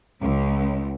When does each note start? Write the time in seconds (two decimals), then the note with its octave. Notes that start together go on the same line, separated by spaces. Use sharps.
0.21 C#2